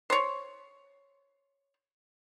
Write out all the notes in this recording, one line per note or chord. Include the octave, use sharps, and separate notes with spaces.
C5 C#5